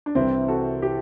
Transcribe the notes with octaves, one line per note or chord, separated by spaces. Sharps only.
D4
C2 C3 E3 C4 E4
F#4 A4
E4 G4